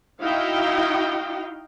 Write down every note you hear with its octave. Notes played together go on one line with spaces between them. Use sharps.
D#4 E4 F#4 D#5 F5 G5